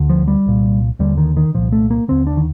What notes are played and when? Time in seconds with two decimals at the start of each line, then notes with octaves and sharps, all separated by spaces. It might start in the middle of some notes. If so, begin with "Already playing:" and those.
Already playing: D2 D3
0.09 F3
0.28 G3
0.46 C2 A#2
0.99 D#2 D3 G3
1.17 D#3
1.37 D#3
1.54 C2 A#2 F3
1.72 A3
1.91 A#3
2.08 D#2 D3 C4
2.27 D4
2.37 D#3